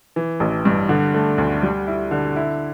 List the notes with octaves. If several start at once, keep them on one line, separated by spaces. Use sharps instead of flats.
E3
A1
G2
D3
A3
D2
G3
E4
D3
E4